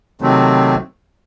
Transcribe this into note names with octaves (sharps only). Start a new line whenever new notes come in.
C3 D#3 F#3 A3 C4